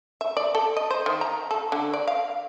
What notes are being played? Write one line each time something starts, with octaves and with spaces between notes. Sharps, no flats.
E5
D5
A4
D#5
C5
D#3
A#5
A4
D3
D5
F5